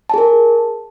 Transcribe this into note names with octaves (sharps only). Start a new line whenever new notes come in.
G#4 A#4 A5